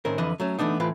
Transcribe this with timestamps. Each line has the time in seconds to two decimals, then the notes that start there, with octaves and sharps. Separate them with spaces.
0.05 A2 D#3 C4 C#4 A#4
0.18 F2 D3 E3 B4 D#5
0.40 F#3 A3 C#4
0.59 E3 A3 B3 D4 D#4
0.80 A2 E3 C4 F4 B4